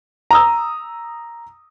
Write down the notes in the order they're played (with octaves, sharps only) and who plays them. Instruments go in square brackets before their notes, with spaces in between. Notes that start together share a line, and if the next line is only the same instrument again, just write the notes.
[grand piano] A#5 D#6 E6